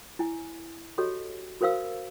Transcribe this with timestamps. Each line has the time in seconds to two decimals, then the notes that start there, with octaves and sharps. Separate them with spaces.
0.19 E4 G#5
0.98 F#4 G4 A4 C#5 D#5
1.61 F#4 A#4 C5 F5 E6